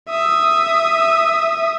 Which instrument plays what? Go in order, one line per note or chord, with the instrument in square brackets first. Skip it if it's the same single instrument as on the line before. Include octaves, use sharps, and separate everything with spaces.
[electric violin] E5 D#6